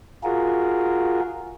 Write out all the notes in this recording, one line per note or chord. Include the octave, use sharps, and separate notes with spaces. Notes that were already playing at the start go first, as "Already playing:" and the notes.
F4 F#4 G#4 A#4